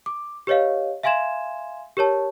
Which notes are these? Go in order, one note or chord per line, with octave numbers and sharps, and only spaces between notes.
D6
G4 B4 C#5 D#5 F5
E5 F5 G#5 C6 G#6 E7
G4 A#4 C#5 A5